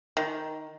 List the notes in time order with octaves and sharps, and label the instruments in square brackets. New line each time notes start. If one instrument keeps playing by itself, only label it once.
[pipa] D#3